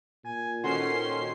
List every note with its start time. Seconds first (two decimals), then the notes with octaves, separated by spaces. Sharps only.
0.25 A#2 G#5
0.64 D#3 C#4 F#4 A4 C5 C6 C7